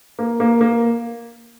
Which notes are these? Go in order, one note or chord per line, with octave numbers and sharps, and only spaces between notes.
A#3
A#3
A#3